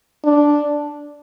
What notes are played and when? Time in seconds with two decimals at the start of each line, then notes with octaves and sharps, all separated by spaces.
0.24 D4